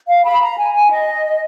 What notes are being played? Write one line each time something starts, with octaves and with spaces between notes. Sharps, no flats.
F5
B5
A#5
G#5
G#5
D#5